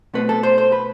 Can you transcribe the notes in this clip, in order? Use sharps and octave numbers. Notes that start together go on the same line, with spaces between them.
B2 A3 C4 B4
A4
C5
C5
B4